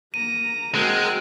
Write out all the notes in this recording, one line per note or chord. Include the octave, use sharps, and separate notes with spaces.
A#3 A#5 D#7
G#3 C4 F#4 A#4 G5 F#6